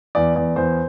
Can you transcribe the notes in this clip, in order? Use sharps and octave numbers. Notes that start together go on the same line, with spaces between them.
E2 D5
E2 D5
E2 C5